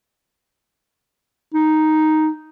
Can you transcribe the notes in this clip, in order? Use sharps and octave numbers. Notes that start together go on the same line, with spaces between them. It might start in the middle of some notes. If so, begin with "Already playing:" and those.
D#4